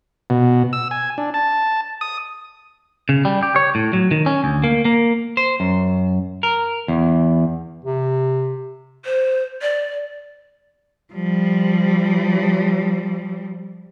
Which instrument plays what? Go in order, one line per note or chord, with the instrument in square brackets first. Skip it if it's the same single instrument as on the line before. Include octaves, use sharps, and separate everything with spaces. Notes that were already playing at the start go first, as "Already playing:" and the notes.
[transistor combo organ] B2
E6
G#5
D4
A5
D#6
[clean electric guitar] C#3
G3
G4
C#5
A2
F#3
D#3
C#4
D2
A#3
A#3
C5
F#2
A#4
E2
[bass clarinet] C3
[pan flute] C5
D5
[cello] F3 G3